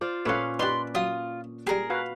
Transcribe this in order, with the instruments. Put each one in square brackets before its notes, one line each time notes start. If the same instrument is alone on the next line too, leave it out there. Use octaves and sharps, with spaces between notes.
[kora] F4 C5 D5
[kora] A#2 C#4 C#5 [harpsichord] A3 F4 [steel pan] B4 F5
[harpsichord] D#4 G4 [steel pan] B4 D5 [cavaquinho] C6
[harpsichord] F#3 [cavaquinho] F4 [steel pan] D#6
[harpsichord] G3 G4 [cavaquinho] G#4 A#4
[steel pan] F#4 B4 F5